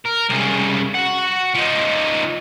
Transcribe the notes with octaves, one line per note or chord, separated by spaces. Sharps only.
A#4
C2 C#3
F#4 F#5
F3 D#4